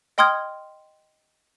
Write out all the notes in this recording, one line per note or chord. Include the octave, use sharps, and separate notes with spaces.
D#5 G5 C6 D#6 F6 G#6